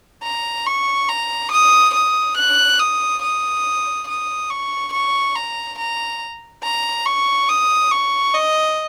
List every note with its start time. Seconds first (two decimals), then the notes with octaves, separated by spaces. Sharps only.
0.23 A#5
0.66 C#6
1.09 A#5
1.51 D#6
1.94 D#6
2.37 F#6
2.79 D#6
3.22 D#6
4.08 D#6
4.50 C#6
4.92 C#6
5.35 A#5
5.78 A#5
6.63 A#5
7.06 C#6
7.49 D#6
7.92 C#6
8.34 D#5